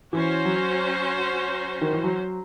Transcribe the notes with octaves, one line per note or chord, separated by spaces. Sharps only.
E3 C#4 F#4 C5
F#3
D#3
E3
F#3